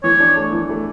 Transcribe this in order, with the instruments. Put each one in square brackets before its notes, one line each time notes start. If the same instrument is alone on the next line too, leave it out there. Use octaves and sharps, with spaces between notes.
[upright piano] E3 [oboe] C#5
[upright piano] D4
A3
E3
A3